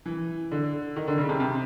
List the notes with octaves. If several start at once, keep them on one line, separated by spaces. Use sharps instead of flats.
E3
D3
D#3
D3
C#3
C3
C3